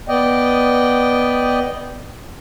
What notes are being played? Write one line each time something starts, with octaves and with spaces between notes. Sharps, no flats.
B3 D5 D#5 G5